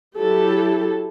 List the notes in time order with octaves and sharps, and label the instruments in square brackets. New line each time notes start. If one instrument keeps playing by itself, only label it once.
[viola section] F#3 E4 G4 A4